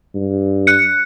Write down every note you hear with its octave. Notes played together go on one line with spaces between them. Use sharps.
G2
F#6 C#7